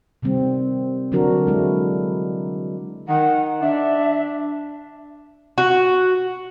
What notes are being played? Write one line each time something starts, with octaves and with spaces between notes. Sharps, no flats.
C3 D#3 G3 C4
D3 F#3 D4 F#4 A#4
G#3 E4 F#4
D#3 F#5
D4 E5
F#4